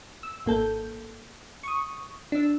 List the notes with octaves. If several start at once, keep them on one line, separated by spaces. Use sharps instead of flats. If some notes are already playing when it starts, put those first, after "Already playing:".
E6
G#1 A#3 A4 G6
C#6 D#6
D4 E6